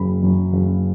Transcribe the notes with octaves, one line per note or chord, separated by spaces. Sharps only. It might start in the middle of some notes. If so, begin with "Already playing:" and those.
Already playing: F#1 B5
F#2
F#1